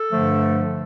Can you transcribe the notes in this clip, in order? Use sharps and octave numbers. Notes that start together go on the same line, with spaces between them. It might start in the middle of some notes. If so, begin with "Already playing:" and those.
Already playing: A4
G2 D3 F3 A3